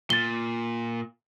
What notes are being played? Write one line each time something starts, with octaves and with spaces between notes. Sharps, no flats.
A#2 A6 G7